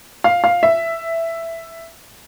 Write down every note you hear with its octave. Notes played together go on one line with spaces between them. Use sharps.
F5
F5
E5